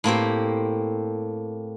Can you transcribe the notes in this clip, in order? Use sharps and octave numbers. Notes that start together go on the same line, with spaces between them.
A2 A#3 C4 G4